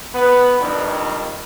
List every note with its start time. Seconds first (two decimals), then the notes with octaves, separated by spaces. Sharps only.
0.15 B3 B4
0.59 F2 D#3 G3 D4